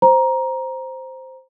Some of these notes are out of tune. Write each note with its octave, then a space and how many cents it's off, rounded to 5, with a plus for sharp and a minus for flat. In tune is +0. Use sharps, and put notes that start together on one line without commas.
C5 +0 A#5 +15